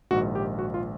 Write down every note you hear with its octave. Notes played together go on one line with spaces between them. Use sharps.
A#1 G#2 D#3 F#4
G4
F#4
F4